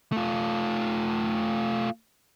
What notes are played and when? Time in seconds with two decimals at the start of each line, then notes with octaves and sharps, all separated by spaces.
0.12 A3 F4